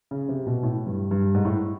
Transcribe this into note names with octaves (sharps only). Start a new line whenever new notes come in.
C#3
C3
B2
A2
G2
G2
G#2
A2